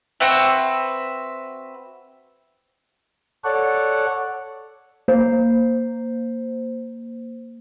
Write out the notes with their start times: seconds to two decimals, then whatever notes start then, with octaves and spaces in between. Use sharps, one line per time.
0.20 C4 F#4 B4 E5
3.44 A4 C#5 D5 F#5
5.08 A#3 C5